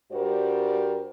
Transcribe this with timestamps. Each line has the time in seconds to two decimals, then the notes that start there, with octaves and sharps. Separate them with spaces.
0.12 G2 G3 F#4 A#4 C5 D5